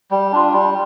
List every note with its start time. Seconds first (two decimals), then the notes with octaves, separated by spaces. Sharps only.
0.11 G3
0.33 D4 F4
0.53 G3